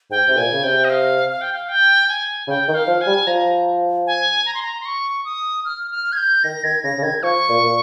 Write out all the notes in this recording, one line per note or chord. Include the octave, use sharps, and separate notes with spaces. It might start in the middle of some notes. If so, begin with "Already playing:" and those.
G#2 G5
C3
A#2 G#5
C#3
C3 G5
D#5
F5
F5
G5
F5
G5
G#5
C#3 G5
D#3
F5
F3
G#5
G3
F3 A#5
G#5
A#5
C6
A#5
C6
C#6
D#6
F6
F6
G#6
G6
D#3 A#6
D#3 G#6
C#3 A#6
C#3
D#3 G#6
F3 C#6
A#2
A#2